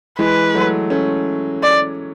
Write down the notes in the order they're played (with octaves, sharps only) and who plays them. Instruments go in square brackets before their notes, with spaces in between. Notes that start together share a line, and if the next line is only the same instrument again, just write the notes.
[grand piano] E3 G#3 [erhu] B4
[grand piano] F#3 A3
A3 C#4
[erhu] D5